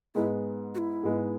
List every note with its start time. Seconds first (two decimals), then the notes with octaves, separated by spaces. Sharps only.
0.15 G#2 G#3 B3 E4
0.75 F#4
0.78 E4
1.03 G#2 G#3 B3